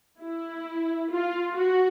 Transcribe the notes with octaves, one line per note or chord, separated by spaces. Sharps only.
E4
F4
F#4